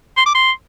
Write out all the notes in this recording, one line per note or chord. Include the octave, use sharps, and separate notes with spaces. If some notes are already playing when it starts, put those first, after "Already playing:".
C6
D6
C6